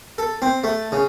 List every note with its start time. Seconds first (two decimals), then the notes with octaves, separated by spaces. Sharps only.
0.18 A4
0.42 C4
0.64 A3
0.92 C#3